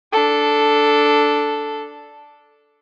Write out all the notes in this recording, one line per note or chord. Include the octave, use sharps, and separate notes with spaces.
D4 A4